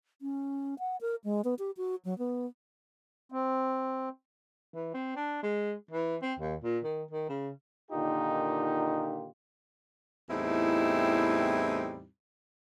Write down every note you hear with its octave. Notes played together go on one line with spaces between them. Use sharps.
C#4
F#5
A#4
G#3
B3
G4
F#4
F#3
B3
C4
E3
C4
D4
G#3
E3
C4
D#2
A#2
D#3
D#3
C#3
A#2 D3 D#3 D#4 F4 G4
E2 A2 G3 C4 D#4 E4